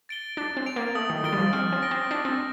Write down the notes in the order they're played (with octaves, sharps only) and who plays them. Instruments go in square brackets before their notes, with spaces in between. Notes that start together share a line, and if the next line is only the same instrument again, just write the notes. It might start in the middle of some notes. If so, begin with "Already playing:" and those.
[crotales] A6 D7 G7
[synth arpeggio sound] D4 [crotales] A6
[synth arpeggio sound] C4
[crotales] D7 F7
[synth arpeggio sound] A#3
[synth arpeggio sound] A3 [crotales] D#6
[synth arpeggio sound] D#3
[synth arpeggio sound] D#3 [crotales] A6 D7 G7
[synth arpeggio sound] G3
F3
[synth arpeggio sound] C4 [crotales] F6
[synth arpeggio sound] C4
[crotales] A#6 D7 G7
[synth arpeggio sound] C4
[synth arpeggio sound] D4 [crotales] A6
[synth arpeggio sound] C4